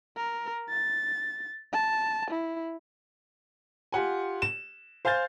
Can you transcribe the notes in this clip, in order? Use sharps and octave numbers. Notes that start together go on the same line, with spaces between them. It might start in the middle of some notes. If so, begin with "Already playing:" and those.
A#4
A6
A5
E4
F4 G4 F#5 G#5
E7
C5 F5 G#5 F6 G6 A6